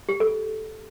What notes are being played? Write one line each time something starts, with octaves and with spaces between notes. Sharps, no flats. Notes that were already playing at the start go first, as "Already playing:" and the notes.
G4
A4